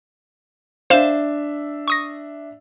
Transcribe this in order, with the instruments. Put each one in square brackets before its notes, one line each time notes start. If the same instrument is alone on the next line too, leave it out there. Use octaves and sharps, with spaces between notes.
[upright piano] D4 E5 [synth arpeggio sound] C5 F5 E7
[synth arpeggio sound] C#6 D#6 A#6